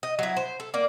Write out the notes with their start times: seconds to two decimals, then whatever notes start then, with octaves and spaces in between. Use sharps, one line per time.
0.03 D#5
0.19 F#3 E4
0.37 C5
0.60 A4
0.74 A#3 D5